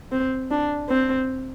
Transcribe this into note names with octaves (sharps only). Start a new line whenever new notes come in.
C4
D4
C4